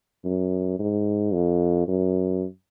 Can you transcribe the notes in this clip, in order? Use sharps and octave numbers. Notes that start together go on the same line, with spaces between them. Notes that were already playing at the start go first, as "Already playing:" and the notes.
F#2
G#2
F2
F#2